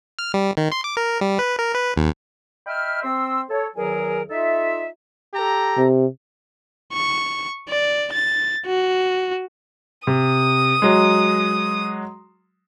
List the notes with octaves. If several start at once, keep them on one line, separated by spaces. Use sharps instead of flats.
F6
G3
D#3
C6
D6
A#4
G3
B4
A#4
B4
D#2
D#5 E5 G5 B5 F6
C4 C6 E6
A4 C#5
E2 D#3 F#3 G#4 A#4 G#5
D#4 F4 A4 E5
G4 A4 A#5
C3
C#6
D5
A6
F#4
C3 D#6
F#3 G#3